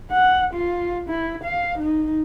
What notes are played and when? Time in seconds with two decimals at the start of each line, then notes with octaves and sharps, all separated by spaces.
0.12 F#5
0.54 F4
1.09 E4
1.44 F5
1.78 D#4